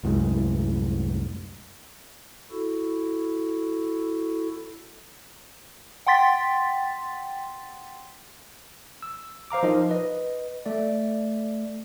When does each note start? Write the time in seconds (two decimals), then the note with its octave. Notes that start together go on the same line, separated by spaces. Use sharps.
0.04 C2 F#2 A2 G#3
2.51 E4 F#4 A4
6.07 F#5 G5 C6 A6 B6
9.03 E6
9.50 C5 F5 A#5 D6
9.63 F3 D#4 A#4 D#5
9.89 B4 D#5
10.66 A3 D5